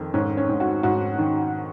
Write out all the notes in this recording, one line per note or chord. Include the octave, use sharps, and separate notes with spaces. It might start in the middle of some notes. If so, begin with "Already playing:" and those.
Already playing: F2 D#3
G#2 C#4
C#4
G#2
F#4
G#2 F#4
D#3